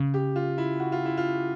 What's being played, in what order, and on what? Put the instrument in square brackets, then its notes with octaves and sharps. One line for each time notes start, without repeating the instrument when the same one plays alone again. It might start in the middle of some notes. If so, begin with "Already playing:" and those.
Already playing: [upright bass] C#3
[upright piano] G4
F4
E4
F#4
F4
E4
F4